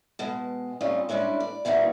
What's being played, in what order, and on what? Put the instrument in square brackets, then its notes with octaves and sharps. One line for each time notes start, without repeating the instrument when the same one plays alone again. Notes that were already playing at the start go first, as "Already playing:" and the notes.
[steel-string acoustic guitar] B2 G#3 A5
G3 C4 C#4 D#4 F4 D#5
G3 G#3 C#4 D4 E4
D5
E3 G3 A#3 D#4 F#4